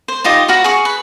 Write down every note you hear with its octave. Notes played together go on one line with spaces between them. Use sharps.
C5
D#4 F4 G4 D#5
F#4 B4 F5 A#5
G#4 C#6
B4